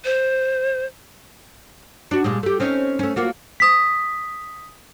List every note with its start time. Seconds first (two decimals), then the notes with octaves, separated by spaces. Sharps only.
0.05 C5
2.11 D4 F#4
2.24 A#2 G3 G#3
2.43 A3 G4
2.60 C4 C#4 D#4
2.99 A3 C#4
3.16 A#3 F4 F#4
3.60 D#6 B6